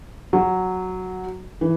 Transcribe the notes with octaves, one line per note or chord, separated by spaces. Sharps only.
F#3
E3